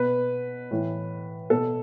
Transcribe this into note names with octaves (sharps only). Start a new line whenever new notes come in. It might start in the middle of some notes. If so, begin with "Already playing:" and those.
Already playing: B2 B4
A2 E3
B2 A4